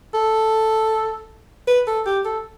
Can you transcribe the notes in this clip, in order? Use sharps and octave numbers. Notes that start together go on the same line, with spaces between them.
A4
B4
A4
G4
A4